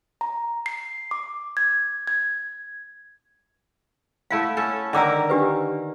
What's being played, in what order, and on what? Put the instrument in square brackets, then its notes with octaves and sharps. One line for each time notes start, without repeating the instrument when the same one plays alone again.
[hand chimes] A#5
C7
D6
G#6
G#6
[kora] A3 E4 F#5 [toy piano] F5
[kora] C#4 A4
[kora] D3 D#3 A#4 [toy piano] E5 D6 E6
[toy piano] D4 G4 B4